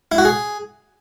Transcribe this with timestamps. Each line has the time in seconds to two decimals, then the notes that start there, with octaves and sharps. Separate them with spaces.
0.12 E4
0.18 F#4
0.25 G#4